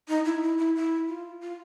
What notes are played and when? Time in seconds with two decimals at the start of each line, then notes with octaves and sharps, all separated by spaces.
0.08 D#4
0.25 E4
0.43 E4
0.58 E4
0.76 E4
1.09 F4
1.41 F4